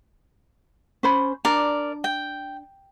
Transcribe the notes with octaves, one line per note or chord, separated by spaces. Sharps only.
C#4 C5 B5
D4 A#4 D5
G5